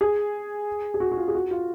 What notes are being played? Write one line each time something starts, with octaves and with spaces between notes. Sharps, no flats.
G#4
G#4
F#4
F#4
F4
G#4
F#4
F4